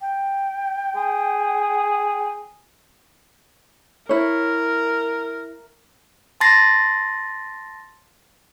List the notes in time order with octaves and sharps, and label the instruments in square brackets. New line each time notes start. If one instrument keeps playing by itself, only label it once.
[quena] G5
[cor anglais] G#4
[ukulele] E4 C#5 [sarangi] A#4
[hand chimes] A5 C6 A6 A#6 C7